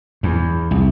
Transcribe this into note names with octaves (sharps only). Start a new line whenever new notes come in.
E2
C2